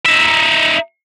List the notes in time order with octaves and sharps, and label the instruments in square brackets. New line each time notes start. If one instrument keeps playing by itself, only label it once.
[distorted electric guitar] D#4 E5